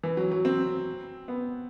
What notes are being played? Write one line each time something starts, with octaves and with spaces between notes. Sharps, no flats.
E3
F#3
F#3
C4
B3